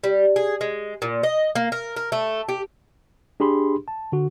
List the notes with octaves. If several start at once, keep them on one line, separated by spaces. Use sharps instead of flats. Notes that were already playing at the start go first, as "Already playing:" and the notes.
G3
G#4
G#3
A#2
D#5
A#3
A#4
A#4
A3
G4
D4 G4 G#4 B5 C6
A5
D3 F#4